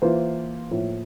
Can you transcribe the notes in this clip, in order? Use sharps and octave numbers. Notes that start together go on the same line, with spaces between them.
E3 A#3 F4 C5
A2 F3 A#3 F4